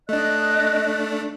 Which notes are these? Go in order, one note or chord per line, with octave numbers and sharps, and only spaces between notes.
A3 D4 D#5 F#6